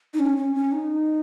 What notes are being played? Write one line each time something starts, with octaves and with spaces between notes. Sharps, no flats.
D#4
C#4
C#4
C#4
D#4